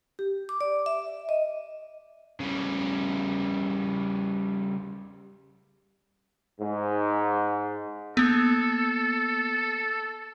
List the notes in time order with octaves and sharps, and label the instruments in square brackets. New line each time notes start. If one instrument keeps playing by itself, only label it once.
[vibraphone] G4
D6
D5
E5
D#5
[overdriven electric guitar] C#3 G3
[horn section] G#2
[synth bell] A#3 B3 [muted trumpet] A4